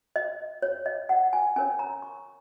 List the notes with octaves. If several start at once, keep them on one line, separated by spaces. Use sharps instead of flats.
D#5
C#5
D#5
F#5
G#5
C#4 A#4 C#5 G#5
A#5
C#6